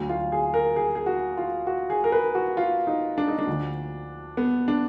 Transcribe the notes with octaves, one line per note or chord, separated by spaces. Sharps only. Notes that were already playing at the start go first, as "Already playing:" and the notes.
Already playing: D2 D3 F#3
F4
G#4
A#4
G#4
G#4
F#4
F4
F#4
G#4
A#4
B4
F#4
F4
D#4
D4
D#4
D4
D2 D3 F3
B3
D4